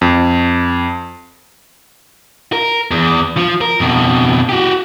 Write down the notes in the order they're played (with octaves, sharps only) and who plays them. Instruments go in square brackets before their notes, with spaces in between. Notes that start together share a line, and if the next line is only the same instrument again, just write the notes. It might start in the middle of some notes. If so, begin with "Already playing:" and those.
[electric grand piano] F2
[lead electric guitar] A#4
E2
F3
A#4
F2 B2
F#4 G4